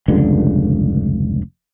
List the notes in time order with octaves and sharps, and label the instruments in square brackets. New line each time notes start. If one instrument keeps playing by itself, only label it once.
[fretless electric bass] F1 C#2 G2 D3